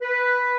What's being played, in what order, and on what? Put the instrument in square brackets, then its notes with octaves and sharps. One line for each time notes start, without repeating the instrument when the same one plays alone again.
[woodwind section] B4